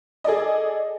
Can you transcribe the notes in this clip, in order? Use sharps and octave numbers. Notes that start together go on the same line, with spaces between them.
G#4 A4 D5 D#5